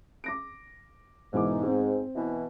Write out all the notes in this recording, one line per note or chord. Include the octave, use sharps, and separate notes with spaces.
D6 A#6 D7
E1 G#2 E3 D6
C4
B2 E3